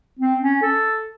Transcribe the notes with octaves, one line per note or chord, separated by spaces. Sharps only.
C4
C#4
A4